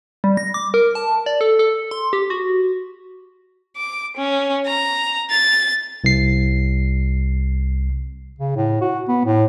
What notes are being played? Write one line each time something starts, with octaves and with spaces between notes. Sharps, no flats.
G3
A#6
D6
A#4
A5
D5
A4
A4
C6
G4
F#4
D6
C#4
A#5
A6
C2 C7
C#3
A2
F#4
B3
A2